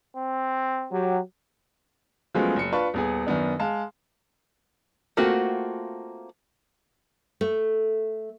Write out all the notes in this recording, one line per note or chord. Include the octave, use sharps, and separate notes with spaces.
C4
F#3 G4
F3 F#3 G#3 A3 B3 C#4
F#1 C#7
D4 F4 B4 A5 C#6
D#1 B3 G#4
F#2 D#3 B3 D4
G#3 F5 A5
A3 A#3 C4 F4 F#4
A3